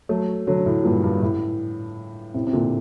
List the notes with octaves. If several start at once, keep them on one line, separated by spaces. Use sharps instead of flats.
F#3 A3
D3 F#3
A2
G2 A#2
G2
A2
A2 C3
C3
A#2 D3